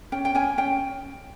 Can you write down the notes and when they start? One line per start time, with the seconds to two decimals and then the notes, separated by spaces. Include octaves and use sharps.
0.12 C#4 G5
0.25 G5
0.35 C#4 G#5
0.58 C#4 G5